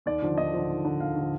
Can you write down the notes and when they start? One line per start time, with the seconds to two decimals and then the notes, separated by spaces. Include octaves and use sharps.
0.06 D#2 D5
0.22 D3 F3
0.38 D#2 D#5
0.53 D3 F3
0.69 D#2
0.85 D3 F3
1.00 D#2 F5
1.16 D3 F3